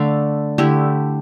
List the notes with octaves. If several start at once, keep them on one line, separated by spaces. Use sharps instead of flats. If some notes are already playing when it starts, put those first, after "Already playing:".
Already playing: D3 A3 D5 F5
D3 A3 E4 G4